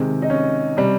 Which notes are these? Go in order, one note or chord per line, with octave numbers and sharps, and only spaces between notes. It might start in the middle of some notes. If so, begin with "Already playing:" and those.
Already playing: C3 D#3 G#3
D#4
C#4
C3 G3